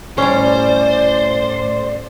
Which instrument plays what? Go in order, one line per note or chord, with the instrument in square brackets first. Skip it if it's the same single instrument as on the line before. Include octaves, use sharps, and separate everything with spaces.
[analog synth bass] A2 [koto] G3 C#4 [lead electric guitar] C5 [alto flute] D5